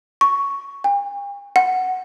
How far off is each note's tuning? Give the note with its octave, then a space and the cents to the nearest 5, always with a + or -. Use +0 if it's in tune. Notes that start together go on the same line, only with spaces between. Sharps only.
C#6 +5
G5 +45
F#5 +5